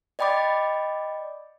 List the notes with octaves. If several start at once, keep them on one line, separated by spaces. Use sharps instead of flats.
D5 D#5 G5 B5 D6 A6